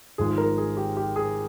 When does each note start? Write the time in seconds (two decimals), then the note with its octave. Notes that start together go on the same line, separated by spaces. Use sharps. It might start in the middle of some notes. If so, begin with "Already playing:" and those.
0.18 G#1 G#2 F3 G#3 G#4
0.38 A#4
0.58 G#4
0.77 G4
0.97 G4
1.16 G#4